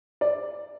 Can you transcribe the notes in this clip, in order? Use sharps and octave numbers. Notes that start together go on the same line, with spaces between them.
D5